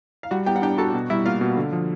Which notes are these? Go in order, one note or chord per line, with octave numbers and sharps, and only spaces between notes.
F5
G3 F#4 F#5
B3 G4 G5
F#5
D4 G4 G5
F#4 A4 A5
B2
G3 E4 E5
A#3 F4 F5
B2
D3
F3